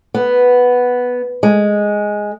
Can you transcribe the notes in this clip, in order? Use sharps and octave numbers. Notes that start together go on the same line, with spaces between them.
B3
G#3